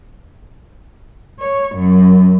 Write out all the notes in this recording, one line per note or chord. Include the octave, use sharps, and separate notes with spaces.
C#5
F#2